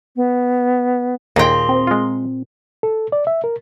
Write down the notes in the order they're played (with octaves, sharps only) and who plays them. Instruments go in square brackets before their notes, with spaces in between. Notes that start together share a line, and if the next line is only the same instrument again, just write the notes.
[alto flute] B3
[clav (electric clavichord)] D#2 [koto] A#2 G5 [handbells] G#4 A#5 C6
[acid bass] C4
[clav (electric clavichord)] G#3 F4
[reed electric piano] A4
D5
E5
A#4